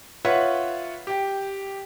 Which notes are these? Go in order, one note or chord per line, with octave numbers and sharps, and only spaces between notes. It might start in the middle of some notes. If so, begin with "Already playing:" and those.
F4 B4 C#5 E5 F#5
G4 G5